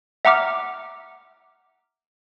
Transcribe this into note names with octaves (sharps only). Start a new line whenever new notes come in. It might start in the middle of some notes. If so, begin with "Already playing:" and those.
E5 F#5 A#5 D6 F6